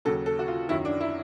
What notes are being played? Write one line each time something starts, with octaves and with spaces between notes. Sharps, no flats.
D#2 C#3 F#3 A4
A4
F#4
F4
F#2 D#3 F#3 E4
D4
E4